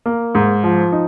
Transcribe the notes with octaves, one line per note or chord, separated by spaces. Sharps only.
A#3
G#2
F3
D#4